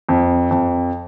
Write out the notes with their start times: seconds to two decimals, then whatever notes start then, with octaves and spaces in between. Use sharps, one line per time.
0.09 F2
0.51 F2